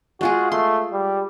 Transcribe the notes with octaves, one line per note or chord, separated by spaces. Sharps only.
G#3 F4 F#4 G#4
A3 C6
G3